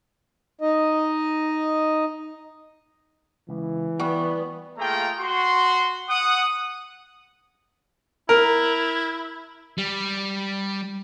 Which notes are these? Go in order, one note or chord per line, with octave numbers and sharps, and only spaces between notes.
D#4 D#5
C#2 E3
G3 B3 F#4
A3 A#3 F4 G#4 G5 A#5
F#4 C6
F#5 D#6
E4 A#4
G3